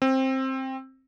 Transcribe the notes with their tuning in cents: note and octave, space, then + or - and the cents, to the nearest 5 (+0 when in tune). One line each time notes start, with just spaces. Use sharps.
C4 +15